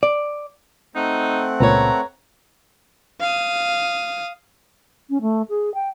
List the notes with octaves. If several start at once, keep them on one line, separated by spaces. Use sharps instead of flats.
D5
A3 C4 D#4 F#5
C#2 A#2 B4 C#5 A#5
F5 D#6
C#4
A3
G#4
G5